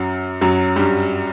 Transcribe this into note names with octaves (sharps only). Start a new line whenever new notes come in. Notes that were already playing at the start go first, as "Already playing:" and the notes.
Already playing: F#2 F#3
F#2 F#3
G2 G3